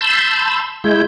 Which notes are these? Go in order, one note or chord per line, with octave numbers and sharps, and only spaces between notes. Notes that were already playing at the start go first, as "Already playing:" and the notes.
A5 B5 C6 E6 G6
G#3 E4 G6